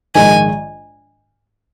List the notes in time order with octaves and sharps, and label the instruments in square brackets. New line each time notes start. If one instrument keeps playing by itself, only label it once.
[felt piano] A#1 G#2 D#3 G#3 [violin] G#5